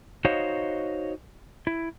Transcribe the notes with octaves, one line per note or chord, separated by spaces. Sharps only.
D#4 F#4 C5 C#5 D#5 F5
E4